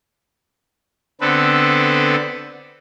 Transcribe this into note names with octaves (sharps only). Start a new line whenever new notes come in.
D3 B3 C4 A4 B4